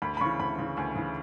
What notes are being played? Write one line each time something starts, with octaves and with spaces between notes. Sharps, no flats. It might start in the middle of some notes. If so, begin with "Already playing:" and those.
D2 B5
B5
C#3 E3 C#6
D2 B5
C#3 E3
D2 G#5
C#3 E3